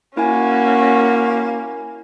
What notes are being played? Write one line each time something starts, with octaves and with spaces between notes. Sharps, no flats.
A#3 C#4 E4 F#4 G#5